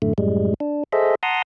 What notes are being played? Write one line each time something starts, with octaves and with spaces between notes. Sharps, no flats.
F#2 A2 D3 A3
F#2 A2 G3 G#3
D4
G#4 A4 C5 D#5 E5
F#5 A5 A#5 C6 D#6